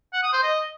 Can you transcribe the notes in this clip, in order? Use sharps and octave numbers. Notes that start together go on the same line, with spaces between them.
F#5
D#6
C5
D#5